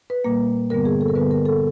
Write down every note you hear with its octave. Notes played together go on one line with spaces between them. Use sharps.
B4
A#2 G3 A#3
G2 D3 G3 B3 A#4
G#4
A4
A#4
G2 D3 G3 B3 B4
A#4
A4